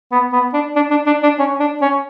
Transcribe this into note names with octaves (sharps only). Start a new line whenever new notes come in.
B3
B3
D4
D4
D4
D4
D4
C#4
D4
C#4